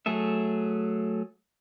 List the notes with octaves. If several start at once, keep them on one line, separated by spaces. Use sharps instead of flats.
F#3 A3 G#4 A4 E5